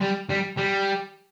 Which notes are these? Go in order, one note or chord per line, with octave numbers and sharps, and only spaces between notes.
G3
G3
G3